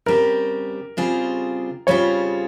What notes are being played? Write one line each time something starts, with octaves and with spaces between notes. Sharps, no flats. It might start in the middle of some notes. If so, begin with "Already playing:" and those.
C#3 G3 C4 G4 A#4
C#3 G3 C4 F4 G#4
C#3 G3 C4 F4 G#4 C#5